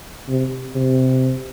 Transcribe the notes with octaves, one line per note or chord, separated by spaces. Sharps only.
C3
C3